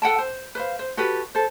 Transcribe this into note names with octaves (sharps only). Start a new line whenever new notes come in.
A4 F#5 G5 A5
C5
B4 C5 F5
C5
F#4 G4 A4 B4
A4 C5